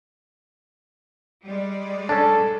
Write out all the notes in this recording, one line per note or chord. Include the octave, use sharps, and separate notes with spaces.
G3 G#3 D5
C#4 D4 A4 A5